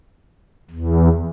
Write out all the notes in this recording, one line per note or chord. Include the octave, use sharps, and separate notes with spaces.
E2